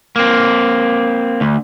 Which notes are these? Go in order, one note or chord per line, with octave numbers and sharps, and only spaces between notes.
A#3 C4
D2